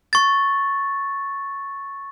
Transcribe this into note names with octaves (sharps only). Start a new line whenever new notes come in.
C#6 A6